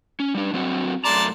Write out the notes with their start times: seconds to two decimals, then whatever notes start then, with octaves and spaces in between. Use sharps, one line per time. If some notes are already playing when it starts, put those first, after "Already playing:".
0.20 C#4
0.35 G3 D4
0.53 F#3 C4 F#4
1.05 F#2 A3 D5 A5 A#5 C6